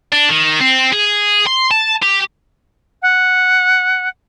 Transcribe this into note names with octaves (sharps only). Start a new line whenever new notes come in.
D4
D#3
C4
G#4
C6
A5
G4
F#5